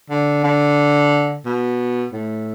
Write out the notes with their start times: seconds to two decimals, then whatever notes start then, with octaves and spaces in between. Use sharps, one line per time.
0.10 D3
0.44 D3
1.46 B2
2.13 A2